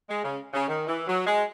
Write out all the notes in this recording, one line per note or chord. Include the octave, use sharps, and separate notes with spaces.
G#3
C#3
C#3
D#3
E3
F#3
G#3